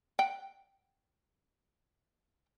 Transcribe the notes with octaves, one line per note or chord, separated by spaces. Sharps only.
F#5 G5